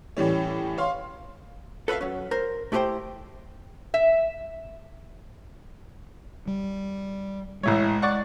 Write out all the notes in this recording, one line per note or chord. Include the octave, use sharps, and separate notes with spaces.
A2 E3 G3 C#4
C#5 F5 C6
A4 B4 C5 E5 F5
F#3 C#4
A#4 C5
A3 E4 G4 B4 C5 G5
E5
G3
A1 A2 G#3 C#5
D5 F#5 C#6